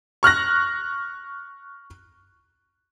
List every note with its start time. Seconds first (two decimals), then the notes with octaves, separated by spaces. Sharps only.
0.23 C#6 F6 F#6 A#6